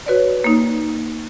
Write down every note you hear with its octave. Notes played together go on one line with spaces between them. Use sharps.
F#4 B4 C#5 D5
A#3 D#4